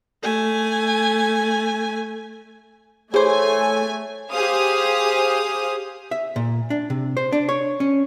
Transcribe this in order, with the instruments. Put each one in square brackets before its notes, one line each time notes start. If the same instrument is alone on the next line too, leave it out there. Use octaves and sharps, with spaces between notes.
[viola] A3 G#5
[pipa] E3 C5 [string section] A3 G#5 [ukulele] G#4 [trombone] C#5
[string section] G4 G#4 C5 F5 D#6
[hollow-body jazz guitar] E5
A#2
D4
C3
C5
D4
C#5
C#4